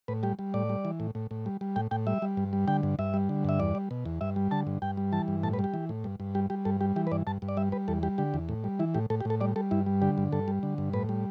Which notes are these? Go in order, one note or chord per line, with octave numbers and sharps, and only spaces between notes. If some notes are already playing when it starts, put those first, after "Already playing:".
A2 B4
G3 G4
G3
A2 D5
G3
E3
A2
A2
A2
G3
G3
A2 G5
A2 G5
G3 E5
G3
G2
G3
D3 G5
G2
G2 E5
G3
D3
G2 E5
E2 D5
G3
B2
E2
G2 E5
G3
D3 A5
G2
G2 G5
G3
E3 A5
G2
A2 A5
B4
G3
G4
E3
A2
G2
G2
G3 G4
G3 G4
G2 A4
G3 G4
E3 G4
B4
G2 D5
G2 A5
G2
D5
G3 E5
G3 B4
E2 A4
G3 G4
D3 G4
E2
A2
G3
E3 E4
A2 G4
A2 A4
G4
A2 A4
G3 D5
G3 A4
G2 E4
G3
D3 G4
G2
G2 A4
G3
D3
G2
A2 B4
G3